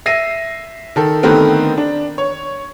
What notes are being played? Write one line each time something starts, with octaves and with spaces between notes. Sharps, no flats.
E5 A#6 C7 D#7
D#3 A4
D3 D#3 A3 B3 C4 A#4
D4
C#5